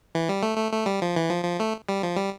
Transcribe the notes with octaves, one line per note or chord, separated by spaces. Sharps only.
E3
G3
A3
A3
A3
G3
F3
E3
F3
F3
A3
G3
F3
G3